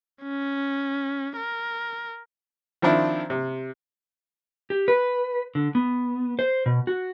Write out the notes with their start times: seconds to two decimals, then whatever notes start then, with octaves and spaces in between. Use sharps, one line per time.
0.23 C#4
1.37 A#4
2.82 D#3 F3 C4 D4 E4
3.30 C3
4.70 G4
4.88 B4
5.55 D3
5.75 B3
6.39 C5
6.66 B2
6.87 F#4